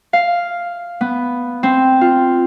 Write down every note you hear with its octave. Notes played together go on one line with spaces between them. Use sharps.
F5
B3
C4
F4